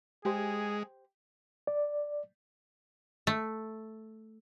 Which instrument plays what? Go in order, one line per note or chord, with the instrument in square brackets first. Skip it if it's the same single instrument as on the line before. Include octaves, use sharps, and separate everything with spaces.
[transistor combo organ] G#3 [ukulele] G4 C5 [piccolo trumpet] G#4
[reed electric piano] D5
[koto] A3